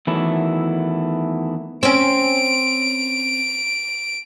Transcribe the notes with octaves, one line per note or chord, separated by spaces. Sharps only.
E2 D#3 E3 F#3 A3 E4
C4 C#4 D7